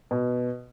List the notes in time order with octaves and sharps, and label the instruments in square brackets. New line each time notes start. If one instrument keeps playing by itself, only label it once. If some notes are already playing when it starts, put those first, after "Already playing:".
[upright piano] B2